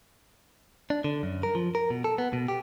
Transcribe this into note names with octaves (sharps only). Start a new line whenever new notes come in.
D4
D3
F#2
A#4
F3
A#4
B2
A4
B3
B2
G4